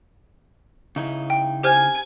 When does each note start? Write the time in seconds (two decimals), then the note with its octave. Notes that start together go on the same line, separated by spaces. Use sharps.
0.96 C#3 D#4 E4
1.30 G5
1.63 G4 C5 G#5 F6